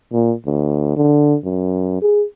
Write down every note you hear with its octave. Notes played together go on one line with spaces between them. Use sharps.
A#2
D2
D3
F#2
G#4